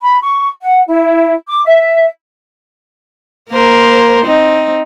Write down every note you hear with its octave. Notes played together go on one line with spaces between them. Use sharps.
B5
C#6
F#5
E4
D6
E5
A#3 A#4 C5
C4 D#4